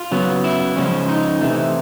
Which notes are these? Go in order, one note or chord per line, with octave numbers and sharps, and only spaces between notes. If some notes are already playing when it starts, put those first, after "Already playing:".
Already playing: F4
C#3 F#3 B3
E4
C#3 F3 G#3 C#4
D#4
C3 E3 A3